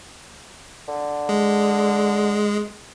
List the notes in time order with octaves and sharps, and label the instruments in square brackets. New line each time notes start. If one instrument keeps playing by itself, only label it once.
[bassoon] D3
[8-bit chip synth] G#3